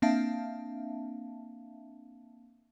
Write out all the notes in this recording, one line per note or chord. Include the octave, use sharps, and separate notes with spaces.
A#3 C4 D4 E5 F5 A5